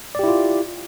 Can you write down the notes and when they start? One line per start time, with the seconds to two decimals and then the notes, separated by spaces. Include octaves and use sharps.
0.15 D5
0.19 G4
0.24 E4
0.28 F4